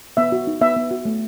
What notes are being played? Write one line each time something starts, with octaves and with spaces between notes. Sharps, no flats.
B3 E5
F#4
D#4
B3 E5
B3
F#4
A3